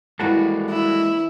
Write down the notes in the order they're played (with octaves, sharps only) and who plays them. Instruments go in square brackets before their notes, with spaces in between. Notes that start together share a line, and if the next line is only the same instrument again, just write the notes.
[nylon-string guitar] E3 A#4 F#5 [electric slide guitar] G3 F#4 A4 [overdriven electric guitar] G#3 A#3
[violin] E4